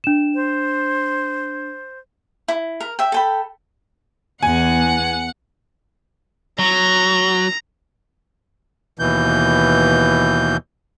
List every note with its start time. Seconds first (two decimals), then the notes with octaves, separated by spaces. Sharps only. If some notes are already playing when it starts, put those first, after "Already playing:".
0.04 D4 E7
0.35 C5
2.48 E4
2.80 A#4
2.99 E5 G5
3.12 A4 G5 B5
4.43 E2 F#5 G#5
6.59 F#3 A#5
8.99 D#2 B2 E3 G6